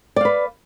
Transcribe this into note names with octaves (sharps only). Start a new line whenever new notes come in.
B4 D5 F5